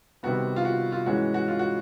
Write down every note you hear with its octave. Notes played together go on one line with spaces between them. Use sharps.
C3 D#3 G3 B3 F#4
F4
F#4
F4
G#2 E3 G#3 C#4 F#4
F#4
F4
F#4